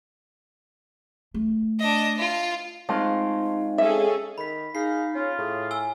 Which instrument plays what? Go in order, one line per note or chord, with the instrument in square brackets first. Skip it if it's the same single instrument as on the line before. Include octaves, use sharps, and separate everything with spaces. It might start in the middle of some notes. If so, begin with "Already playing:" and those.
[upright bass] A3
[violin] D4 D#5
F4
[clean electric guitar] G#3 C4 F4 [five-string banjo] A3 [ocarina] D#4
[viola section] C#4 G#4 A4 [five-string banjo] E5
[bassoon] D#3 [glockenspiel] B5 B6
[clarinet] D#4 [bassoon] G#4 [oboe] F5 [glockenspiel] C7
[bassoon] C#4 [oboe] F4
[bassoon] A2 [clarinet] G#4
[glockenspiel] G#5 E6 G7